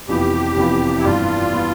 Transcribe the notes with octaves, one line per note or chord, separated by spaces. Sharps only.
F1 F2 E3 B3 F4 G4
F1 F2 E3 B3 F4
E4
G2 E3 B3 F4
E3 B3